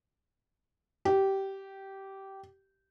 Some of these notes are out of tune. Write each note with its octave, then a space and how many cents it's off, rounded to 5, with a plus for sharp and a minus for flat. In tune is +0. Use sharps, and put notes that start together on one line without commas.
G4 -15